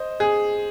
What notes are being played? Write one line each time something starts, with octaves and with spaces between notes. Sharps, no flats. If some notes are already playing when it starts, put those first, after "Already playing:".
Already playing: C5 D#5
G#4